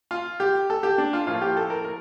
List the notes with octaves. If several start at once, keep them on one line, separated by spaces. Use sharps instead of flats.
F4
G4
A4
G4
D4
F4
A2 F3 A#3 F4
G4
A4
A#4
A#4